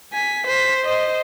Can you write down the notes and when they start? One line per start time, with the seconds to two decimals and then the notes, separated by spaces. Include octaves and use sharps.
0.13 G#5 B6
0.47 C5 B6
0.85 C5 D#5